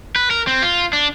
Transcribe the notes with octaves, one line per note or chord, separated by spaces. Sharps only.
B4
A#4
C4
F4
D4